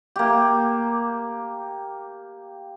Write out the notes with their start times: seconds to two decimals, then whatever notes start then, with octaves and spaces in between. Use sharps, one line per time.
0.16 A#3 G4